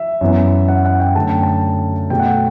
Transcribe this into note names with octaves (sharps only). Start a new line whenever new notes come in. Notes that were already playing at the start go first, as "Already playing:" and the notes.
Already playing: E5
F#2 E3 B3
F#5
F#5
G5
F#2 D3 A3 A5
G5
A5
B2 A3 G5
F#5
G5